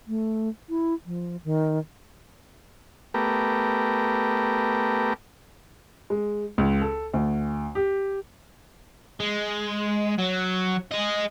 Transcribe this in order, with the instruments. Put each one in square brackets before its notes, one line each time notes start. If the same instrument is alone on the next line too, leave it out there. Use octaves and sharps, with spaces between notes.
[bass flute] A3
E4
F3
D#3
[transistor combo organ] A3 B3 G4 A#4
[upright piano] G#3
C#2
A4
D2
G4
[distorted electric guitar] G#3
F#3
G#4 D#5